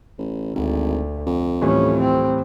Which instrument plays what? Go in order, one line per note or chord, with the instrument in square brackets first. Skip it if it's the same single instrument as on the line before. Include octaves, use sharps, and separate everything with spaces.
[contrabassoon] A1
[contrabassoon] G#1 [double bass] D2
[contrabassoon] F2
[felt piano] A2 E3 G3 [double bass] C#4
[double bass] C4